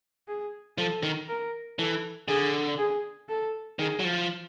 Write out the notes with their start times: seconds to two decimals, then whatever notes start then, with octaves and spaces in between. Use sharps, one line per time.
0.28 G#4
0.78 F3 A4
1.03 D#3
1.28 A#4
1.79 E3 A4
2.28 D3 G#4
2.78 G#4
3.29 A4
3.79 D#3 G#4
3.99 F#3
4.04 F3